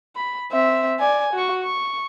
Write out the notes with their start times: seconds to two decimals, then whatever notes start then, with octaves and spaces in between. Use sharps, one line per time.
0.16 B5
0.52 C4 E5
0.99 D5 G#5
1.33 F#4 C#6
1.63 C#6